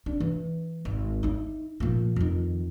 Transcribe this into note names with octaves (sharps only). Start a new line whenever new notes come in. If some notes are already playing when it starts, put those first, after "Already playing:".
D4
E3
G#1
D#4 E4
A#2 F3
F2 D#3